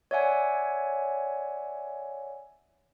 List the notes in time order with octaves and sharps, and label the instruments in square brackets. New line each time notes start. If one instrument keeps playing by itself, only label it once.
[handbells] C#5 D5 E5 F#5 G#5